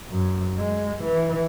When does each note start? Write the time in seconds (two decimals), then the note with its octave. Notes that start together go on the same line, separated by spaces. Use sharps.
0.11 F#2
0.58 G#3
1.03 E3